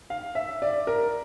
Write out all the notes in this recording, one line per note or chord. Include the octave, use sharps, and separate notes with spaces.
F5
E5
D5
A#4